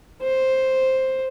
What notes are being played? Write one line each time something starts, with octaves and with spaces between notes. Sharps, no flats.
C5